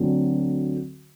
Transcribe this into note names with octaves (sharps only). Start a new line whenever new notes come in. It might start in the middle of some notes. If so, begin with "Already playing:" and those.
Already playing: D2 D3 F#3 C4